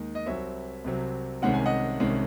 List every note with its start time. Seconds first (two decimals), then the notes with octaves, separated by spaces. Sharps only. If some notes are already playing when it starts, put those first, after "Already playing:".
Already playing: D#2 D#3 G#3 D#4
0.15 D#5
0.26 C2 C3 F#3 C4 C#5 E5
0.84 C2 C3 F#3 C4
1.42 C2 C3 D#3 G#3 C#4 F#5
1.54 G#5
1.66 D#5 F#5
2.00 C2 C3 D#3 G#3 C#4